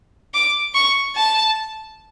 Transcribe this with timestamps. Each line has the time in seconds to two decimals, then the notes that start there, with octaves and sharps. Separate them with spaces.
0.34 D6
0.75 C#6
1.16 A5